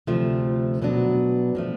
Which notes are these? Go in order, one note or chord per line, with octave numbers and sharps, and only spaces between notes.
D2 C3 F3 A3
B2 F#3 B3 D4
A2 F3 A3